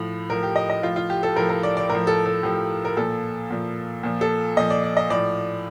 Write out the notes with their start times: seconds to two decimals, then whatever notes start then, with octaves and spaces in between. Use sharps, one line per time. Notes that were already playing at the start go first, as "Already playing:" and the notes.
Already playing: A2 F3
0.30 A2 F3 A#4
0.43 G4
0.56 D#5
0.70 D#5
0.83 A2 F3 F4
0.96 F4
1.10 G4
1.23 A4
1.36 A2 F3 A#4
1.49 A#4
1.63 D5
1.77 D5
1.89 A2 A#4
1.95 F3
2.07 A4
2.26 A4
2.43 A2 F3 G4
2.85 A#4
2.97 A#2 F3 A4
3.50 A#2 F3
4.03 A#2 F3
4.21 A4
4.57 A#2 F3 D#5
4.70 D5
4.84 D5
4.97 D#5
5.10 A2 F3 D5